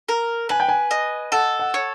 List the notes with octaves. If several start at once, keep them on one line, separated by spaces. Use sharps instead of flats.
A#4
B4 G#5
G5
G#5
D#5
A4 F#5
F#5
C#5